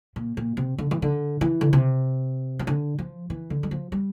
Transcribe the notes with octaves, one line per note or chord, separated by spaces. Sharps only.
A#2
A#2
C3
D3
E3
D3
E3
D3
C3
E3
D3
F3
E3
D3
G3
F3
G3